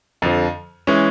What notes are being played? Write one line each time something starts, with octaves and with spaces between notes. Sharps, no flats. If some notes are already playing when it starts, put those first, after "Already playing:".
F2 D3 F3
E3 G#3 C#4